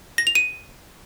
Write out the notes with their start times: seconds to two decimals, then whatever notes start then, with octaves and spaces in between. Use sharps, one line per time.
0.18 A#6
0.27 F7
0.35 D#7